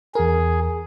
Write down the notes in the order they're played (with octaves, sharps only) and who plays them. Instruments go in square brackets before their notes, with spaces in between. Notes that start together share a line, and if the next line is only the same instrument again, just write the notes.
[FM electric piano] E2 A#4 [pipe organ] G#4